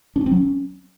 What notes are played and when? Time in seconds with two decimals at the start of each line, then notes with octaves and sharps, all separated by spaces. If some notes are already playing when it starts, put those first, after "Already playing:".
0.16 D4
0.21 C#4
0.26 C4
0.31 F#3
0.37 C#4